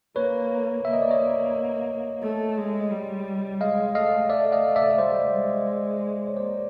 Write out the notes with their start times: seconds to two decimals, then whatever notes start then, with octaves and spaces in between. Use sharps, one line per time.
0.16 A#3 B4 C#5
0.84 A#3 E5
0.93 D#5
1.02 D5
1.11 C#5 D#5
2.22 A3
2.58 G#3
2.91 G3
3.61 G#3 D#5 F5
3.95 A3 D#5 F5
4.30 A3 D5 E5
4.52 D#5 F5
4.76 D5 E5
4.98 G3 C5 D5
5.34 G#3
6.27 C#5
6.37 A#3 C5 D5